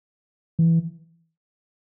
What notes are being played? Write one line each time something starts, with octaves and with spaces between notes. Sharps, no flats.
E3